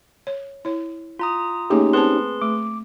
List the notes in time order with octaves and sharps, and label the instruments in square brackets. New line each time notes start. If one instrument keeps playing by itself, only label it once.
[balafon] C#5
E4 C#5
[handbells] F4 A#5 D#6
[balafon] A3 A#3 G#4 [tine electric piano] C#4 D#4 G4
[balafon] C4 C5 A5 [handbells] G#4 B4 C6
[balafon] A3 [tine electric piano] D6